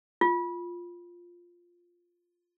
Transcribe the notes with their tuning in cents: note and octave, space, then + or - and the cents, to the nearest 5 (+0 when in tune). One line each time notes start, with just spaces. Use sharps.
F4 +5